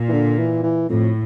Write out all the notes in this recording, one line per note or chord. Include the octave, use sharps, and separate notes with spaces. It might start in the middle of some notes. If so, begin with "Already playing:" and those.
Already playing: A#2
E3
D3
E3
E3
F2 A2